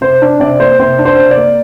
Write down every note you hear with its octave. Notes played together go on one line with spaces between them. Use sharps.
C3 C5
D4
C3 D5
A#3 C5
C3 C5
D4
C5
C3
D5
A#3